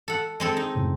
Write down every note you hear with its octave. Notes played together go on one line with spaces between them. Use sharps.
A4 F#5
G#3 C4 A4
D#4
F#2 A2 C#3